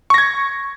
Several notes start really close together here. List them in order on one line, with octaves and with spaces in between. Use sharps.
C#6 A#6 G#6